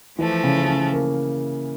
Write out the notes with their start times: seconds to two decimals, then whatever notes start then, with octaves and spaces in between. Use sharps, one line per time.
0.19 E3 F3 A3
0.44 C#3
0.67 C#4
0.92 A#3